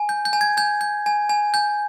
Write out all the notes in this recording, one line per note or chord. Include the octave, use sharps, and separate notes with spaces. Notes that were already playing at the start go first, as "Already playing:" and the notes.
Already playing: G#5
G6
G6
G#5
G#6
G#5 G6
G6
G#5
G#5
G#5 G6